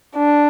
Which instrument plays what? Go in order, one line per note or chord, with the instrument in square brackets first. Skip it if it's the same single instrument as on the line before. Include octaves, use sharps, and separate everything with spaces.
[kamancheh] D4